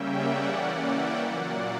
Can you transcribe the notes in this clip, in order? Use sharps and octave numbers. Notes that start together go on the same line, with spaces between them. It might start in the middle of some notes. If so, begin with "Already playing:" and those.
Already playing: C#3 G3 A#3 C#4 E5 G5
D5 F#5
E3 A#3 C#4
E5 G5
A#2 F#3 A#3 D5 F#5